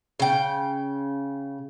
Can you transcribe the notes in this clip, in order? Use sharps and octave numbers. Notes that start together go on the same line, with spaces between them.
C#3 G5